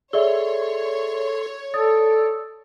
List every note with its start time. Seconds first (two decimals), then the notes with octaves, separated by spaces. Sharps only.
0.13 G#4 A4 C#5 D5 E5 C6
1.74 A4 D5 D#6